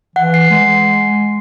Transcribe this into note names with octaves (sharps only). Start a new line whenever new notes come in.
E3 F#5
C7
G#3